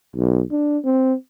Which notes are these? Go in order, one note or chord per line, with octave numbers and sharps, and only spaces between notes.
B1
D4
C4